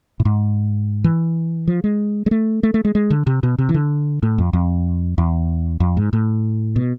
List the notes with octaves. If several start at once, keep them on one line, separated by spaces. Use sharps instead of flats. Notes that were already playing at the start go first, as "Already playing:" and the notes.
A2
G#2
E3
F3
G#3
G#3
A3
A3
A3
G#3
G#3
D3
C3
B2
C3
E3
D3
A2
F2
F2
E2
F2
G#2
A2
B2